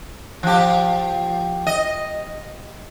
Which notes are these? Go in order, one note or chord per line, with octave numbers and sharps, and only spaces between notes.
F3 G4
D#5